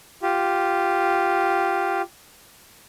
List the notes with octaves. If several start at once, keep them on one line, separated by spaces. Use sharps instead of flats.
F4 G4